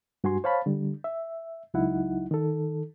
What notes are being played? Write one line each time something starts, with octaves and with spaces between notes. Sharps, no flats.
G2 F#4 G#5 C6
C5 C#5 F5 A5 B5
D3 G3
E5
C#2 F#3 D#4 E4 F#5
D#3 A4